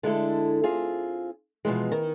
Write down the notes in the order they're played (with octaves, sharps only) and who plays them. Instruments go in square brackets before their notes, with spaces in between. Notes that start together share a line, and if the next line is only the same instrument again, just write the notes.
[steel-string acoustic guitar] D3 G#3 E4 A4
C4 F4 G#4
B2 E3 F3 G#3
D#3